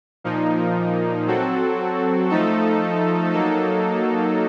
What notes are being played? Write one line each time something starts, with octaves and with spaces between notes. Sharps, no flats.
A#2 F3 A#3 D#4
F#3 C4 F#4 A4
F3 A3 D#4 A4
F#3 A#3 D#4 A4